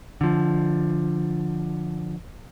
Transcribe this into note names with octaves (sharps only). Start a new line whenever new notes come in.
D3 F3